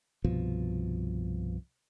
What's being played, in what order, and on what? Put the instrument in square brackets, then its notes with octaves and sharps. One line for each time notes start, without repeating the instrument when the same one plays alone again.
[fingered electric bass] C2 G2 B2 F3